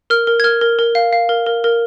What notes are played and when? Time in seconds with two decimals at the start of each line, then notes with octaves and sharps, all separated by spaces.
0.10 A#4 F6
0.27 A#4
0.40 G#6
0.44 A#4 F6
0.61 A#4
0.79 A#4
0.95 F5
1.13 F5
1.29 A#4
1.46 A#4
1.64 A#4